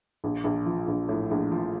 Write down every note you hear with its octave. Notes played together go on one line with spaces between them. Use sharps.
A#1
A#1
F3
A#1
A2
A#1
F3